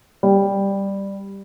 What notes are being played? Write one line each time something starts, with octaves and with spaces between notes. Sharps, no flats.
G3